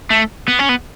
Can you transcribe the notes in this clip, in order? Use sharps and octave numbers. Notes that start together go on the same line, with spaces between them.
A3
B3
C#4
B3